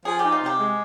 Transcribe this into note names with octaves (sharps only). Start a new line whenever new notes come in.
F3 G#4
D#4 G4
F4
C3 G4
G#3